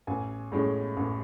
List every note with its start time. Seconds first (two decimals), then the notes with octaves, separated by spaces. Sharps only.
0.07 A1 G#5
0.52 A2 G#3 C#4
0.97 A1